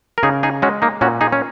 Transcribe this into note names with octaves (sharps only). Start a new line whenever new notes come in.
A#4
C#3 D#4 G#4
D#4 G#4
G#3 C#4 F#4
A#3 D#4
A#2 C#4 F#4
D#4 G#4
C#4